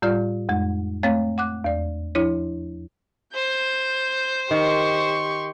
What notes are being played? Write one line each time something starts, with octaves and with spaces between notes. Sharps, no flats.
A2 G3 F4 D5 F6
F2 G#3
A3 C4 C#5 F5
F#5 D6 F#6
E2 D5
F3 D4 E4 C#5
C5 G6
D#3 G4 C6 C#6